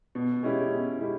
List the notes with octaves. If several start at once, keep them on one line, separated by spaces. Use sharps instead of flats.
B2
G#3 C#4 E4 G4
B2
G#3 C#4 E4 G4